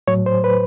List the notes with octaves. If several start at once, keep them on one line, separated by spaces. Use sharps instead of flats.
A2 F#3 C#5
C5
B4